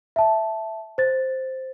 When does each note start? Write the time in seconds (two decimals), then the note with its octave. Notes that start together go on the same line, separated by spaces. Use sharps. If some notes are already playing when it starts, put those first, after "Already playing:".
0.16 E5 A5
0.98 C5 A6